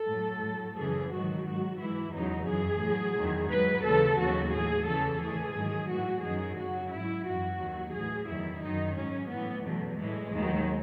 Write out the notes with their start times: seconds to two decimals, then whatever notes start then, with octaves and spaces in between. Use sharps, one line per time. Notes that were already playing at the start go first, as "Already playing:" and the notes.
Already playing: A4
0.10 A2 F#3
0.44 A2 F#3
0.78 F#2 C#3 E3 G#4
1.12 G#2 D#3 F#3 F#4
1.47 G#2 F#3 F#4
1.80 G#2 E3 E4
2.14 E2 C#3 F#3 D#4
2.48 F#2 E3 G#4
2.82 A2 F#3
3.17 E2 D#3 F#3
3.50 G#2 F#3 B4
3.85 D#2 C#3 E3 A4
4.19 D#2 C#3 F#3 F#4
4.53 A2 E3 G#4
4.87 E2 C#3 E3 A4
5.21 A2 E3 G#4
5.55 G#2 D#3 F#3
5.89 A2 E3 F#4
6.24 F#2 D#3 F#3 G#4
6.58 F#2 C#3 F#3 F#4
6.91 G#2 F#3 E4
7.26 F#2 E3 F#4
7.59 D#2 D#3 F#3
7.94 A2 E3 G#4
8.28 E2 D#3 F#3 E4
8.62 F#2 D#3 F#3 D#4
8.96 G#2 F#3 C#4
9.30 A2 E3 B3
9.64 E2 B2 F#3 A3
9.99 A2 E3 G#3
10.33 D#2 D#3 F#3